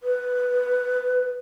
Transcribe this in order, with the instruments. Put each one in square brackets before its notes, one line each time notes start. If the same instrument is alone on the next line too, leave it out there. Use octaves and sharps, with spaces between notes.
[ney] B4